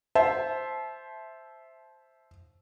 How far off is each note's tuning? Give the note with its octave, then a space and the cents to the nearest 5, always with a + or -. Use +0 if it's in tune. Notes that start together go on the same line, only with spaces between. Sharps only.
C5 +0 E5 +0 A5 -25